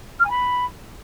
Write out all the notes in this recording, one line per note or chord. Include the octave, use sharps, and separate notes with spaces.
F6
G#5
B5